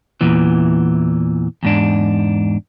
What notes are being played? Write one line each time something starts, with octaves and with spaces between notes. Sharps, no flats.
E2 A#2 E3
E2 G#2 D4